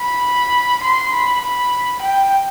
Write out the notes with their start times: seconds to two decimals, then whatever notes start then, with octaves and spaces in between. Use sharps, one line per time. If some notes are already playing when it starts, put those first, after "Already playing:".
Already playing: B5
0.83 C6
1.13 B5
1.42 B5
2.02 G5